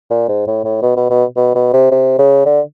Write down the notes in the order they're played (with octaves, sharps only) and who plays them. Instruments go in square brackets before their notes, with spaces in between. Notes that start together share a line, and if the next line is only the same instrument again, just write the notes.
[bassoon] A#2
G#2
A2
A2
B2
B2
B2
B2
B2
C3
C3
C#3
D3